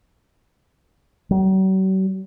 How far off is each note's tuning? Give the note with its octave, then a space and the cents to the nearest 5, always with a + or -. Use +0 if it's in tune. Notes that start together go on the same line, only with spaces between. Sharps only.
F#3 +45